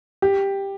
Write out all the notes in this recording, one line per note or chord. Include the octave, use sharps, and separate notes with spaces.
G4